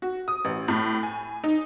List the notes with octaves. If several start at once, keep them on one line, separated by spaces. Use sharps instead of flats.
F#4
D#6
A1
A2
G#5
D#4